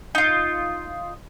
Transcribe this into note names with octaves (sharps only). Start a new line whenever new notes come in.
D#4 F4